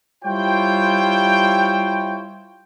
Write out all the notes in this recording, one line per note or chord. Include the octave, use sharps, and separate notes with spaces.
G3 E4 F4 C5 C#5 G5